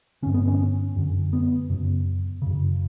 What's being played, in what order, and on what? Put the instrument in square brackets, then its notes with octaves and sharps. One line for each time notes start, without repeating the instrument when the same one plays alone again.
[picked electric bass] D3 C#4
G2
B3
C#4
F#2 D3
B3
F#2 C#3
F#2 C#3